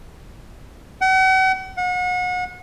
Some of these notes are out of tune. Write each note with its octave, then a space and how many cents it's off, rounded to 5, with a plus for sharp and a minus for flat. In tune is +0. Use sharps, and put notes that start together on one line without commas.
F#5 +40
F#5 -35